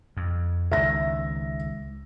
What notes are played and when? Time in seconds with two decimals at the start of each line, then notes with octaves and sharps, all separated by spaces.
0.17 F2
0.72 C#2 D#3 E5 A#6